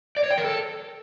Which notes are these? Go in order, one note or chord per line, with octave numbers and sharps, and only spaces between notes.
D5
C#5
G5
A#4
A4